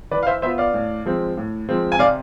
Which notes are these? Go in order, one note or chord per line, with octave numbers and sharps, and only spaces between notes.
E3 B4 D5
F5
C5 E5
B3 F4 C5 E5
D5 F5
A2
F3 G#3 C4
A2
F3 G#3 C4
G#5
C3 D5 F5